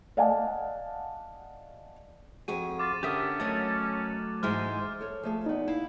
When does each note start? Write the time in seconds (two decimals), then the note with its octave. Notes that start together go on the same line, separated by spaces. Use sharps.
0.17 D5 D#5 F5 F#5 G#5 A5
2.48 F2 F#4 G#4 D#7
2.79 F4 D6 A6
3.03 D3 C#4 G4 A#4 E5 D#6
3.40 F#3 A3 A4 A#4 C#5 D#5
4.43 G#2 E3 G#3 C5 F6
5.01 A4 C#5
5.23 F3 A3 G#4
5.46 E2 B3 D#4
5.68 E4 F5